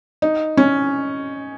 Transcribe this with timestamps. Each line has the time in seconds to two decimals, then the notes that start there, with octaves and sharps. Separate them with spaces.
0.22 D#4
0.57 C#4